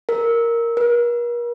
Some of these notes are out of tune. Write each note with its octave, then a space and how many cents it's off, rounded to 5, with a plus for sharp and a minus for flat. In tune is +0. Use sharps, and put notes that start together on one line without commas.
A#4 -5
A#4 +45